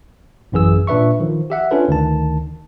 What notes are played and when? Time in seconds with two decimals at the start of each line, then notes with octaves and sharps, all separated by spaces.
0.52 A1 F#2 E3 G#4 E6
0.87 A#2 D4 B4 E5 C#6
1.20 D#3 F3
1.50 G4 E5 F#5
1.71 C#4 D4 F4 A4 B4
1.88 D2 D#3 A5